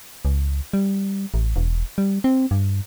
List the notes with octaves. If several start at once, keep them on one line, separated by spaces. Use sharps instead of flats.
C#2
G3
A1
E1
G3
C4
G2